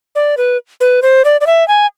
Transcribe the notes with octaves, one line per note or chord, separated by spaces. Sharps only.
D5
B4
B4
C5
D5
D5
E5
G#5